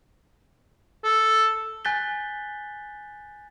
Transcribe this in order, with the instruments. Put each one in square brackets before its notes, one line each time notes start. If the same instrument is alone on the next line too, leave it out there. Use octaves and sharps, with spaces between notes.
[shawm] A4
[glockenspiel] G#5 F#6 G6 A6 B6 G7